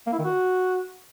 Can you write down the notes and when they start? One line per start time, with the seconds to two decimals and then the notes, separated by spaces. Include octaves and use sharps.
0.07 A#3
0.13 E4
0.19 D#3
0.25 F#4